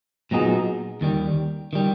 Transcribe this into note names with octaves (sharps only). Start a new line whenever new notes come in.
A#2 F#3 B3 D#4 G#4
D#2 D#3 G3
D#3 G3